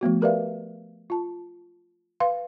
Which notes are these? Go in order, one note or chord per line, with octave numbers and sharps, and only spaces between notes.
F3 A3 B3 F#4
G4 A#4 B4 D5 E5 F5
F4 A5
B4 F5 C6